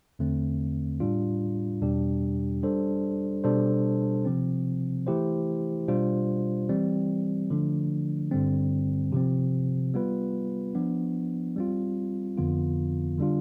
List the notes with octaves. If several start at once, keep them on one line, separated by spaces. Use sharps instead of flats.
E2 D3 A3 C4
A2 G3 D4 F4
E2 B2 G3 D4 G4
G3 D4 A4 C5
B2 G3 D4 A4 C5
C3 F3 C4
E3 A3 E4 G4 C5
B2 G3 D4 F4 C5
E3 G3 C4
D3 F3 A3 D4
G2 D3 G3 C4
C3 F3 C4
G3 B3 F4 B4
F3 B3 D4
G3 C4 F4
F2 D3 F3 B3 F4
D3 G3 D4 F4